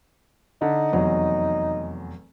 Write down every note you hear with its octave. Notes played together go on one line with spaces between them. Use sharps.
D3 D#4
F1 E2 F#3